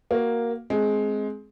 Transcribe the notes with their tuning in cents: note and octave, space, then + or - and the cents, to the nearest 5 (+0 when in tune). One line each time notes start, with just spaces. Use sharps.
A#3 +0 F#4 +0
G#3 +15 C4 +10